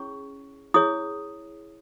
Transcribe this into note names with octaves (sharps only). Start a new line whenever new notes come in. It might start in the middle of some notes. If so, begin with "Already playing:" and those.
Already playing: C#4 E4 G#4 C#5 C#6
E4 G#4 C#5 D#6